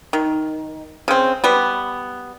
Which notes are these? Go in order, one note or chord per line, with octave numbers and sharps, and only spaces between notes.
D#3
C#3 C4
G3 B3